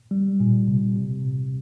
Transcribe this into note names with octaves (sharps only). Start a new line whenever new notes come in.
G3
A#2
C3
C3